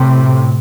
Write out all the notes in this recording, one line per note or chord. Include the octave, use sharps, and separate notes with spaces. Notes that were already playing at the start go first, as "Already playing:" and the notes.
Already playing: A2 C3